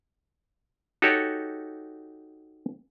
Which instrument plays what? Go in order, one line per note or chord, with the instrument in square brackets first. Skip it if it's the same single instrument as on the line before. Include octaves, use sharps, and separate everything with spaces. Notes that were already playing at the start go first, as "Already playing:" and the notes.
[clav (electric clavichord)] D#4 F#4 G4 A4 C#5